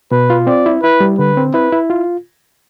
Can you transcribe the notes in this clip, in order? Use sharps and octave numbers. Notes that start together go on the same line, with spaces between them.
B2 B4
F4
C4 D5
E4
E4 B4
G3
D3 B4
C4
E4 B4
E4
F4